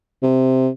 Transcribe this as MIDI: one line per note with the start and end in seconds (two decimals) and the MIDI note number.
0.23 0.69 48